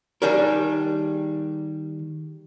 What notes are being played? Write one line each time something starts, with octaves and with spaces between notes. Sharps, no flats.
D#3 G3 D4 G#4 A#4